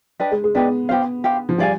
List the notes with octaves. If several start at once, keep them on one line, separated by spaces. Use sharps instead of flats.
D4 G4 B4 D#5
G#3
G#3
B3 D4 G4 B4 D#5
B3 G4 C5 F5
G4 C5 F5
F3
G3 G#4 D5 F5 G#5